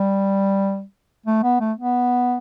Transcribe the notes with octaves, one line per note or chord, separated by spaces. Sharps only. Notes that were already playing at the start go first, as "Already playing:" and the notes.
Already playing: G3
A3
B3
A3
B3